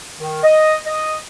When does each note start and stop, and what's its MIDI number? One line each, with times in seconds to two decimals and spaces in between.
0.19 0.39 51
0.42 0.74 75
0.86 1.15 75